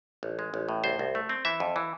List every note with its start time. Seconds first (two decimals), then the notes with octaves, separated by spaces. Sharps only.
0.23 A1
0.39 G#3
0.54 A1
0.69 A2
0.84 C2 C5
0.99 C2
1.15 A3
1.29 C4
1.45 E3 E5
1.60 F2
1.76 E3